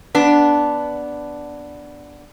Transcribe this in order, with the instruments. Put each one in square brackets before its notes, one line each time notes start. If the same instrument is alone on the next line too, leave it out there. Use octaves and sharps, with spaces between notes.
[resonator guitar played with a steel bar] B3 D4